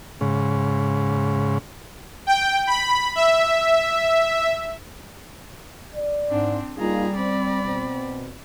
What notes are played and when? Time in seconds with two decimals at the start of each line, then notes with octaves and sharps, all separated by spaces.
0.21 G#2 C#3
2.27 G5
2.67 B5
3.15 E5
5.95 D5
6.29 G#2 C4 D4
6.78 G3 A#3 D#4 F4 G#4 A#5
7.16 C4 D5 B5
7.63 B2 C4